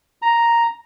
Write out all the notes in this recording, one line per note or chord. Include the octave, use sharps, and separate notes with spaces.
A#5